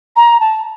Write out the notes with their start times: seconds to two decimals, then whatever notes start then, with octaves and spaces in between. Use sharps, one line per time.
0.16 A#5
0.40 A5